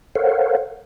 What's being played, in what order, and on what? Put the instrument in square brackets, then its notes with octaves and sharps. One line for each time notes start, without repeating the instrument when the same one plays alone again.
[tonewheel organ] A4 A#4 C5 C#5 F5 F#5